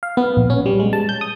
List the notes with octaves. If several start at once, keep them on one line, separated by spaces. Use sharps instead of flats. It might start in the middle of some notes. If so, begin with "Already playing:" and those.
F5
B3
A#1
C#4
G3
G#3
A5
G6
D#6